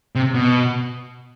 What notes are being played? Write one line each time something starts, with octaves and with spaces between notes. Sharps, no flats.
C3
B2